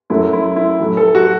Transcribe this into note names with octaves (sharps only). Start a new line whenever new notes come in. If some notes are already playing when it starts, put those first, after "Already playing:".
F#2 F#3 A3 E4
E4
E4
A2 F#3 A3
A4
F#4